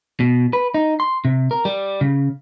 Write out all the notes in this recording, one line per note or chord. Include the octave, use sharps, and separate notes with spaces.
B2
B4
D#4
C6
C3
A#4
G3
C#3